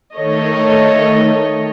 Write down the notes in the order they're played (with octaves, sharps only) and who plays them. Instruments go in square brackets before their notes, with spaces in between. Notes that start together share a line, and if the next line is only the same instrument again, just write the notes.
[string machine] D#3 A3 [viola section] A4 C#5 D#5